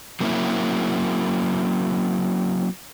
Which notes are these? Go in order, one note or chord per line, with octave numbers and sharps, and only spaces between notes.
F#3 A#3 C4 C#4 E4